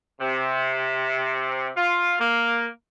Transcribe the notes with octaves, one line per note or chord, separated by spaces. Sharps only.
C3
F4
A#3